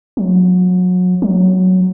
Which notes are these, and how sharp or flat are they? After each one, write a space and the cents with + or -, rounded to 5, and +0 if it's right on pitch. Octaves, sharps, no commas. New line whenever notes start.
F#3 -30
F#3 +0